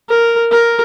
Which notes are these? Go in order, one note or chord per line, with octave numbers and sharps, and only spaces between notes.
A#4
A#4